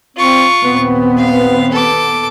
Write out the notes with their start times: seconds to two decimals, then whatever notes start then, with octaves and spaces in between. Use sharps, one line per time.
0.17 C4 F4 C#6
0.64 D#2 A#2 B3 C4
1.17 F5
1.72 A4 D6